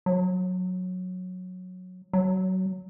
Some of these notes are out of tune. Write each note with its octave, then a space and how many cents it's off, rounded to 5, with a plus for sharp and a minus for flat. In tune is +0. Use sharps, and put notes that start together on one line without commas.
F#3 -15
F#3 +20